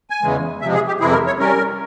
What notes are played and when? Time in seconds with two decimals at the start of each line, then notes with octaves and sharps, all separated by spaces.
0.10 G#5
0.23 E2 C#3 E3 G#3
0.62 C3 F3 G#3 E5
0.75 G#4
0.87 G4
1.00 F2 C3 E3 G#3 E4 G#4
1.13 A#4
1.27 C#5
1.39 G3 C#4 A#4